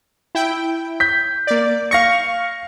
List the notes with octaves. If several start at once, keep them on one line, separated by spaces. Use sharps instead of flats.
E4 G5
G6 B6
A#3 D5
F5 C#6 A#6 C#7